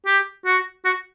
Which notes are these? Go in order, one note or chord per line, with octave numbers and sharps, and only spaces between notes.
G4
F#4
F#4